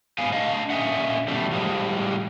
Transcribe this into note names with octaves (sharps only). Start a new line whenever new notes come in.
G#2 B3 F5 G#5
D4 D#5 F5
A#2 D3 C#4 D#5 E5 F#5
B2 E3 G3 A3
A2 F3 G3 G#3